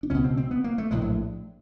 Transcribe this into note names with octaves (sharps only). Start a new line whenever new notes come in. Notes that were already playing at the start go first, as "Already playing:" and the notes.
D4
C#2 B2 C#4
C4
C4
B3
A#3
A3
A#1 A2 G#3
F#3